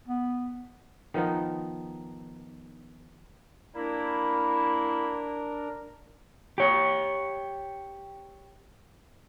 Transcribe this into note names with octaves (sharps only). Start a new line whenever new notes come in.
B3
D#3 F3 B3 D#4
A#3 D4 E4 A#4
G4 C#5